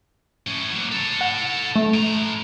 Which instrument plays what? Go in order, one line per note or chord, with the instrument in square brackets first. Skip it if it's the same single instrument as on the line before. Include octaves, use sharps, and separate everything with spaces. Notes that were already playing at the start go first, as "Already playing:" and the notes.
[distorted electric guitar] A2 C#4
F#3 A#3
A4 C#5
[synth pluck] F#5
A3
[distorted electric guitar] A2 A#5